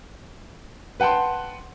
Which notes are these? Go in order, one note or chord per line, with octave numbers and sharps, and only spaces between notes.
B4 F#5 G5 A5 C6